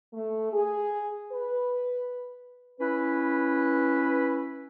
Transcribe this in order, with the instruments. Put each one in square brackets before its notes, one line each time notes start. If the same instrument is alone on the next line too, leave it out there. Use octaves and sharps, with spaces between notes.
[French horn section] A3
G#4
B4
[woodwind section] C#4 E4 B4